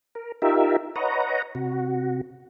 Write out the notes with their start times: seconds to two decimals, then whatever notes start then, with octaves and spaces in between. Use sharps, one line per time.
0.15 A#4
0.42 D#4 F4 G4 A#4 E5
0.96 B4 C#5 D#5 F#5 A#5
1.55 C3 F#4